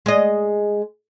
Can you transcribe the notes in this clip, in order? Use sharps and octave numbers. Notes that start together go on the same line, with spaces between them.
G#3 D#5